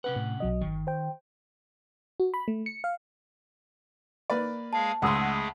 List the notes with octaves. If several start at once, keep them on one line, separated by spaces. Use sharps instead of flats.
C3 C#4 B4 F#5
A2
B1 F#3 D#5
G1 D#3
C5 G5
F#4
B5
A3
C#7
F5
A#3 B4 D5
G#3 G#4 F5 A5
C#2 G#3 A3 G#4 F#5 C6 D#6 E6